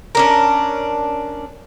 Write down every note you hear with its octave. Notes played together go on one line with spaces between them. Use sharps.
C#4 D4 A#4